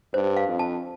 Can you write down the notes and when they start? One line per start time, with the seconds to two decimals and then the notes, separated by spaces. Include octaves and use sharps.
0.14 G2 C5
0.37 F5
0.48 F2
0.59 A5